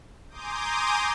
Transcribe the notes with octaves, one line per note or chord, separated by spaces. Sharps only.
G#5 A#5 C6 D6 D#6 G6